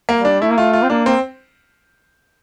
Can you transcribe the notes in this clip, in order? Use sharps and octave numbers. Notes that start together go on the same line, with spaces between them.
A#3
G3
D4
A3 E4
A#3
A3 F4
F4
C4
A#3 D4
C4